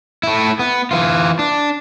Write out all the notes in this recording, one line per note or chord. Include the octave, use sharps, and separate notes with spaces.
A3 E4
B3
E3 F4
D4